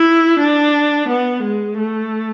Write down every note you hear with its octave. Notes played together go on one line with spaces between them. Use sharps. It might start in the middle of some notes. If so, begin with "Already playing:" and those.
Already playing: E4
D4
B3
G#3
A3